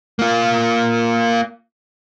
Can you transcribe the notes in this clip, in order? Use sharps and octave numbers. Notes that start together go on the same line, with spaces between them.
A#3 F4